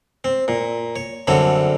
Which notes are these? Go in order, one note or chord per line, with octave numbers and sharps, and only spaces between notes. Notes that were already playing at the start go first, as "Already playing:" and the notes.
C4
A#2
C#5
F#2 D3 G3 C4 A4 C#5